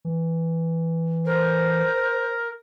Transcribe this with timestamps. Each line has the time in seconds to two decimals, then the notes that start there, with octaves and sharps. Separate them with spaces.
0.05 E3
1.25 A#4 C5